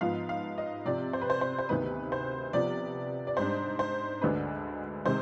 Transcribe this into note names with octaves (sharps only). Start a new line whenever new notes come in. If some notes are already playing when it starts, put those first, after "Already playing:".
G#2 F3 B3 F5
F5
D#5
C3 F3 C4 D5
C5
B4
C5
C5
C5
D2 C3 D#3 B3 D#4 B4
C5
C3 F3 B3 D5
D5
G#2 G3 D4 C5
C5
D2 D3 G#3 D4 B4
C3 D#3 G#3 C5